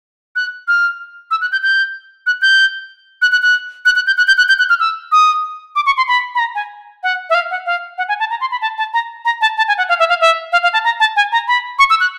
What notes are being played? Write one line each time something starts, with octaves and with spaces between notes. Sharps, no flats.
F#6
F6
E6
F#6
G6
G6
F#6
G6
F#6
F#6
F#6
F#6
F#6
G6
F#6
G6
F#6
G6
F#6
F6
E6
D#6
D6
C#6
C6
B5
B5
A#5
G#5
F#5
E5
F5
F#5
F5
F#5
G#5
A5
A#5
C6
B5
A5
A5
A#5
A#5
A5
A5
G#5
F#5
F5
E5
F5
E5
F5
F5
A5
A#5
A5
G#5
A#5
B5
C#6
E6
F#6